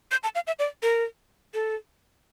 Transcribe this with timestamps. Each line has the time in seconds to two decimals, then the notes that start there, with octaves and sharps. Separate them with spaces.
0.11 G6
0.23 A5
0.35 F5
0.47 E5
0.59 D5
0.82 A#4
1.54 A4